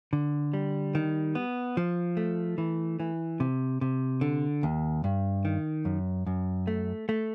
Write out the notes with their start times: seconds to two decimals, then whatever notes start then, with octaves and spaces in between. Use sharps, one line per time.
0.13 D3
0.54 G3
0.95 D#3
1.35 B3
1.77 F3
2.17 A3
2.58 E3
3.00 E3
3.40 C3
3.81 C3
4.21 D3
4.63 D#2
5.04 G2
5.45 D#3
5.85 F#2
6.27 F#2
6.67 A3
7.09 A3